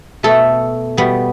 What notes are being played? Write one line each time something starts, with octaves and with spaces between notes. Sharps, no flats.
B2 A3 A4
B2 G3 B3